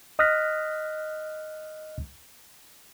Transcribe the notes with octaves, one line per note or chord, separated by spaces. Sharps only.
D#5 D#6 F6 F#6 A#6 B6